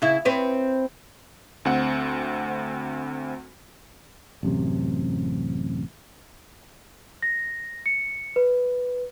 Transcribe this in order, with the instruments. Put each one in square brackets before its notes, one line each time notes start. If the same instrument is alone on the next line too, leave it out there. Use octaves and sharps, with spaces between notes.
[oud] C#3 E4
C4 B4 C#5
[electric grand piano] D2 C4 F#5
[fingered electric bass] A1 F#2 C3
[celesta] A#6
C#7
B4